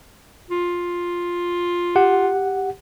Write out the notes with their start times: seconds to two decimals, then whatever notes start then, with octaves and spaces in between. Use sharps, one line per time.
0.50 F4
1.96 G4 F#5